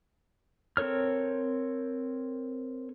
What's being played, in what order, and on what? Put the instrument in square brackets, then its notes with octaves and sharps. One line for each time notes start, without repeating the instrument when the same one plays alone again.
[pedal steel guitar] C4 A4 A#4 C#5 F6